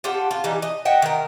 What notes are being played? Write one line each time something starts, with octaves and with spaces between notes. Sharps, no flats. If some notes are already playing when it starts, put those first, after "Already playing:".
F4 G4 A4 F#5
F4
E3 G3 D#4
D#5
D#5 E5 F#5 G5
D#3 A#4